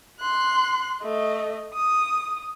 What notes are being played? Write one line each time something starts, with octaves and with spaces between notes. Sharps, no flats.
C6 F#6
A3 D#5
D#6